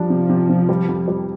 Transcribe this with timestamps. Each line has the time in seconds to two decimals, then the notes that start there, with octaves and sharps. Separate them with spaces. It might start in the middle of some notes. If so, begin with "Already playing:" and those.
Already playing: F3 G3 D4
0.10 C3
0.29 C3
0.49 C3
0.69 G3
0.88 F2
1.08 G3